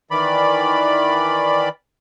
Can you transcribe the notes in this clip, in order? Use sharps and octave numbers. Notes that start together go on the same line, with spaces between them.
D#3 E3 D5 B5